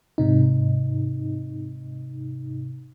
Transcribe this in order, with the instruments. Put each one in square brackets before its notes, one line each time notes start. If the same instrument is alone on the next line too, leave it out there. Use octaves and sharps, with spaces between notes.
[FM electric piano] G#2 C3 D#4